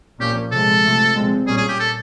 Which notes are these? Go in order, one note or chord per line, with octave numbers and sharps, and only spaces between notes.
A#2 F3 A#3 C#4 G4
C3 F3 G#3 A4
C3 F3 A3 C4
A#2 F3 G#3 C4
A#2 G3 A#3 C#4 G#4
G#4
G4
A4